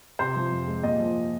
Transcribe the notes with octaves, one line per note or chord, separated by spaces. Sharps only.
C3 C5
F3
F2
G#3
A#2 D#5
F3